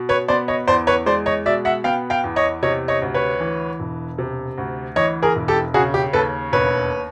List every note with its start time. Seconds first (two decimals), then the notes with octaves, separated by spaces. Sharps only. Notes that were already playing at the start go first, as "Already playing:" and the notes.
Already playing: B2
0.09 B4 C#5
0.28 B3 C5 D5
0.48 C#5 D#5
0.67 E2 C5 D5
0.87 B4 C#5
1.06 G#3 C5 D5
1.26 C#5 D#5
1.45 B2 D5 E5
1.65 E5 F#5
1.84 B3 F5 G5
2.10 F5 G5
2.24 E2
2.36 C#5 D#5
2.63 C3 C#5 D#5
2.88 C#5 D#5
3.02 D2
3.14 B4 C#5
3.41 E3
3.79 E1
4.18 C3
4.58 D2
4.96 E3 C#5 D#5
5.23 G#4 A#4
5.36 E1
5.48 G4 A4
5.74 C#3 F#4 G#4
5.94 G4
6.13 D#2 A4 B4
6.52 E1 B4 C#5